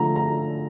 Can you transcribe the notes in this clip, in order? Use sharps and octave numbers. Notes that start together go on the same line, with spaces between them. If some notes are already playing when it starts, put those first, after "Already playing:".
Already playing: D3 F3 A3 A#5
A#5